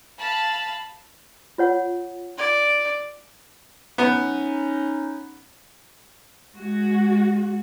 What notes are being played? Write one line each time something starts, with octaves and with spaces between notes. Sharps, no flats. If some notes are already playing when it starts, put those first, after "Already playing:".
F5 A5 B5
F4 C#5 F#5
D5
B3 C#4 D#4
G#3 F#4